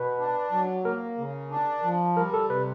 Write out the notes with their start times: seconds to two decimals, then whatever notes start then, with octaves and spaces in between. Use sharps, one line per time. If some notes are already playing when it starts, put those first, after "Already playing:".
Already playing: B2 B4
0.19 D4
0.52 F#3
0.85 A#3 A#4
1.18 C#3
1.51 D4
1.83 F3
2.17 G3 A#4
2.34 A4
2.50 C3 B4